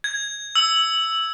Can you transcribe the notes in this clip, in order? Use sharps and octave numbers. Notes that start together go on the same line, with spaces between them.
G#6
E6